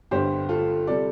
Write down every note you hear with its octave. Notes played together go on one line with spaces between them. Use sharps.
G1 G2 D3 G3 G4 C5
F4 A4
C3 G3 A4 D5